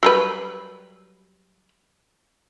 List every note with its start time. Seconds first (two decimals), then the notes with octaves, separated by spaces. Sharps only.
0.03 F#3 G3 B4